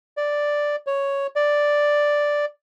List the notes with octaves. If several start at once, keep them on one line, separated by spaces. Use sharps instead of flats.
D5
C#5
D5